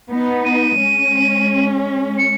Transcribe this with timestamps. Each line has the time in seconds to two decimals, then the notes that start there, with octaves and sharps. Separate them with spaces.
0.11 B3 D#4
0.45 D#7
0.80 G#3 C#4
2.18 C#7